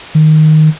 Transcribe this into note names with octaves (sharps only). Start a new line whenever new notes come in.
D#3